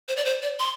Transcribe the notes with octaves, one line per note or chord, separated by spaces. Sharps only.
C5
D5
C5
D5
C6